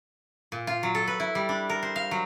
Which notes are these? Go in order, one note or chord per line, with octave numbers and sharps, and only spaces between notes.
A#2
F4
F#3
A4
B4
E4
G3
D4
A#4
C5
F5
F#3